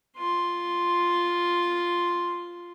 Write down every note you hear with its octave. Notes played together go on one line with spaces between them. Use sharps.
F4 C6